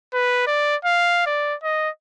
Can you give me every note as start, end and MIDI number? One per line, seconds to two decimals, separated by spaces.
0.14 0.42 71
0.47 0.76 74
0.85 1.24 77
1.26 1.55 74
1.63 1.89 75